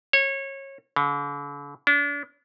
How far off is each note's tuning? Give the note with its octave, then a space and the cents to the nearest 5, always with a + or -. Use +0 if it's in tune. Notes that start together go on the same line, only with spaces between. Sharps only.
C#5 -25
D3 -45
D4 -35